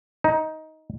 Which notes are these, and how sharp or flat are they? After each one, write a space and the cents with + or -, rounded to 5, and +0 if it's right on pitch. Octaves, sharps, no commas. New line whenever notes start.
D#4 +15